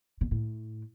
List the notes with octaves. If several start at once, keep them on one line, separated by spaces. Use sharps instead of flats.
B2
A2